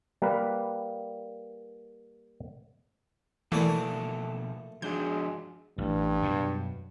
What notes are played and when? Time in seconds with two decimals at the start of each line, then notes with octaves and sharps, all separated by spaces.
0.22 G3 A#3 A#4 B4
3.52 B2 E3 F3 A3 A#3 A4 D5
4.82 F3 G#3 D4 F#4 G6
5.78 A1 G2
6.22 F#2 B2